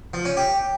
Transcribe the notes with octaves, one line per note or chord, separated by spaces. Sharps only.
F3
C#4
G4